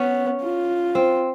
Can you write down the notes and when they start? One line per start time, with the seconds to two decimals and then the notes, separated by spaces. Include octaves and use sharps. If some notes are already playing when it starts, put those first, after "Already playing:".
Already playing: B3 C#4
0.43 F4
0.95 C4